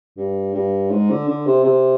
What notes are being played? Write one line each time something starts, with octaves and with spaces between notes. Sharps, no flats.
G2
G2
G#2
D3
D3
C3
C3